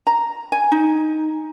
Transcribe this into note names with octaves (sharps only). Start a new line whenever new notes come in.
A#5
G#5
D#4